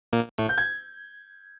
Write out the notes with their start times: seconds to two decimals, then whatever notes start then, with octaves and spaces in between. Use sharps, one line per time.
0.13 A#2 A#3
0.38 A2 A3
0.49 G6
0.58 G#6